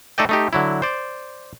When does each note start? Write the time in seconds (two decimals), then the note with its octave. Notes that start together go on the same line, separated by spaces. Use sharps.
0.18 A3 D#4 A4 D5 D#5 G5
0.29 A3 D#4 G4
0.53 D3 F#3 E4
0.82 C5 D5